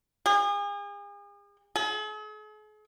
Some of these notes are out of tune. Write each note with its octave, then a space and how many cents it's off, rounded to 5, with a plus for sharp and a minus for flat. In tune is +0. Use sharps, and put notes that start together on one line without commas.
G#4 -40
G#4 +45